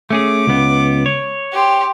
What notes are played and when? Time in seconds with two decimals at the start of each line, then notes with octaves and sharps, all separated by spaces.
0.10 A3 C#4 G#4 D6
0.47 C#2 B3
1.06 C#5
1.52 G4 C6